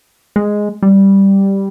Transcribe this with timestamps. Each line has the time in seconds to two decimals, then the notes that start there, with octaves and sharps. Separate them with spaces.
0.36 G#3
0.83 G3